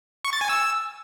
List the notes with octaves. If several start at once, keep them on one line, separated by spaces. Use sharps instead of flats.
C#6
A6
G#5
E6